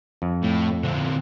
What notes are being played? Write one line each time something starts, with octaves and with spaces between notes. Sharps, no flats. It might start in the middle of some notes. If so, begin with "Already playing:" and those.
F2
A2
D3 C4